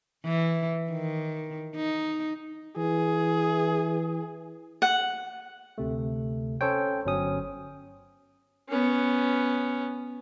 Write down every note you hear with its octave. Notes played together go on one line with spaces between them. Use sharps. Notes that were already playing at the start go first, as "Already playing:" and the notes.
E3
D#3
D#4
E3 G#4
F#5
D2 C3 A3
C#4 A4 C5 C#5 G5
G1 F#3 C#4 D#6
B3 C#4